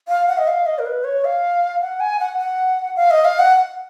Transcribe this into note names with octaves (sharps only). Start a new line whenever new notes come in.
F5
F#5
D#5
F5
D#5
A#4
B4
C#5
F5
F#5
G#5
F#5
F#5
F5
D#5
F5
F#5